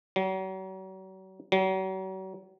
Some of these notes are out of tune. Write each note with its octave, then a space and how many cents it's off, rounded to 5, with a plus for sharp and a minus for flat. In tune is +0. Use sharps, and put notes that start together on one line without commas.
F#3 +40
F#3 +40